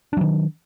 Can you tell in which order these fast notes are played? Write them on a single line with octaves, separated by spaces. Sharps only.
D4 F#3 D#3